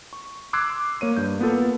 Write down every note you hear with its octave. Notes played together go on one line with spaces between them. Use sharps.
C#6
C6 D6 E6 F#6 G#6 C7
A#3 C#5 D#7
G2 G6
A#3 B3 F4 A4